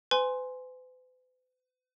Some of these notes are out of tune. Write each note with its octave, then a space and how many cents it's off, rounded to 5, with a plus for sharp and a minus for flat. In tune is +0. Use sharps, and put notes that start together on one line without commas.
B4 +45 G#5 +0 C6 +0